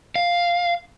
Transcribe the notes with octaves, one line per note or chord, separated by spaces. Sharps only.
F5